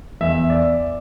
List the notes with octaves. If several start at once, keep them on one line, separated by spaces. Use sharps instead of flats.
E2 E5
D5